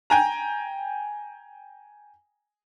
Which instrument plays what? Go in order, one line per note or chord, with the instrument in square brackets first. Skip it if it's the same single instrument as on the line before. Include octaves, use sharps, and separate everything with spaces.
[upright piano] G5 G#5 A#5